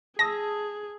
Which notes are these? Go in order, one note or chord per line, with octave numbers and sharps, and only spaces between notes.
G#4 A5 D#6 E6 A#6